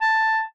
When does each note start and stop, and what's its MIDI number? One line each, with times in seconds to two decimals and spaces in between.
0.01 0.42 81